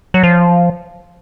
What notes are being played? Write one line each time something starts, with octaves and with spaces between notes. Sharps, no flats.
F#3
F3